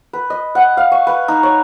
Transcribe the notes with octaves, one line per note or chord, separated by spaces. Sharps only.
B4
D#5
F#5
F5
C#6
B4
D#4
C#5